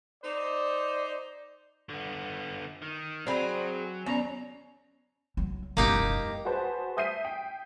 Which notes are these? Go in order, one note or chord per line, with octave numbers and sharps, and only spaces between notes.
D#4 C5 D5
D3 B3
D#3
F#3 C4 G#4 D5 B5
D#2 B3 C#4 C#5 D5 A#5
F#3
E1 F#2 A#3 D#4 G4
F#4 G#4 B4 C5 A5
E5 D#6 G6 B6 C7 D#7
G5